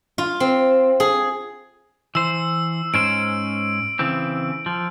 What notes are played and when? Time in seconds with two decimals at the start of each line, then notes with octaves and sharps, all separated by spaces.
0.18 F4
0.40 C4
1.00 G#4
2.15 E3 C5 E6
2.94 G#2 C#4 C5 D7
3.99 C#3 E3 C4
4.66 F3